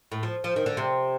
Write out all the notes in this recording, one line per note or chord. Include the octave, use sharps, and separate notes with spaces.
A2
F3
F3
D#3
D3
C3